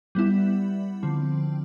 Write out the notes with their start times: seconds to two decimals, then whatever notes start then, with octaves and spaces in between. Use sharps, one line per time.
0.15 G3 B3 E4
1.03 D3 F3 C4